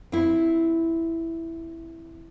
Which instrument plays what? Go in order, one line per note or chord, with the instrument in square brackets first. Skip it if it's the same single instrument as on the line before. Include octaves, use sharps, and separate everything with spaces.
[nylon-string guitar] C4 E4